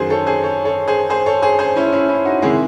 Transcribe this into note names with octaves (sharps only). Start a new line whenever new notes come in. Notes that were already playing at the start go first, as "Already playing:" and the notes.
Already playing: F#2 D#3 F#3 G#4 C5
A4 C#5
G#4 C5
A4 C#5
A4 C#5
G#4 C5
G#4 C5
A4 C#5
G#4 C5
G#4 C5
C#4 E4
C#4 E4
C#4 E4
D#4 F#4
C3 D#3 G#3 E4 G#4